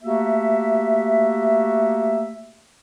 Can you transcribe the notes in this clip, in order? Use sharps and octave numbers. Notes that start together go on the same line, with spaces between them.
A3 A#3 F#4 G4 E5